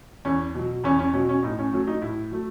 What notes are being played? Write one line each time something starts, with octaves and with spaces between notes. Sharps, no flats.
E2 C#4
B2 F#3
E2 C#4
C#4
B2 F#3 C#4
C#4
A2 D#4
C#4
F#3 A3 C#4
D#4
A2 E4
F#3 A3